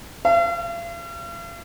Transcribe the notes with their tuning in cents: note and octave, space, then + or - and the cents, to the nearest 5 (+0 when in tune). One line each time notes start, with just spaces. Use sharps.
F5 -45